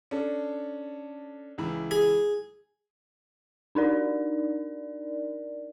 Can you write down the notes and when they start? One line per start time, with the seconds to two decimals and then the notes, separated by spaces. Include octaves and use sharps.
0.11 C#4 D4 A4
1.58 C#2 E3 E4
1.91 G#4
3.75 D4 D#4 A#4 D5